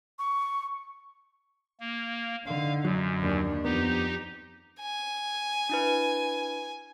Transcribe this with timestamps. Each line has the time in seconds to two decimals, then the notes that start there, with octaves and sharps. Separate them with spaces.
0.19 C#6
1.80 A#3
2.46 D3 D#4 F5
2.85 F#2 F#3
3.20 D#2 D4
3.65 F2 B3 D#4 G4
4.82 G#5
5.69 D4 E4 B4